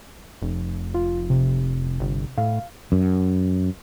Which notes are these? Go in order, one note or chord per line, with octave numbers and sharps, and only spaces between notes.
F1
F4
C3
G1
A2 F5
F#2